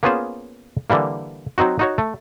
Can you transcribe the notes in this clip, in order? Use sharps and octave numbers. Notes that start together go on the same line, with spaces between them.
A#3 B3 C#4 F4 G#4 C5
D3 E3 G3 A#3
F#3 C4 D#4 F#4
D#4 F#4 C#5
A3